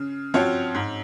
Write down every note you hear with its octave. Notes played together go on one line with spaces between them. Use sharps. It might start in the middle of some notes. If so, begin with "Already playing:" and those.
Already playing: C#3
F3 C4 F#4 C#5
G#2